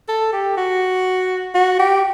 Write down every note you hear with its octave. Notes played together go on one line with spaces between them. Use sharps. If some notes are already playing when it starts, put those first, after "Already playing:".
A4
G4
F#4
F#4
G4